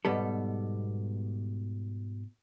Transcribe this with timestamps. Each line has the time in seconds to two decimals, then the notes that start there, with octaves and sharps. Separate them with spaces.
0.05 G#2 B2 G3 B3 A4